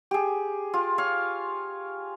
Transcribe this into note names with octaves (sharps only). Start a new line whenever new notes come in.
G4 G#4
F4
C#5 F5